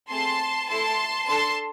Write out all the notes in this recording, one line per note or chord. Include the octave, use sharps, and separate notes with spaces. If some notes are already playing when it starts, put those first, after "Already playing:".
A3 C4 G#4 A5 C6
A3 E4 A4 A5 C6
D4 A4 A5 C6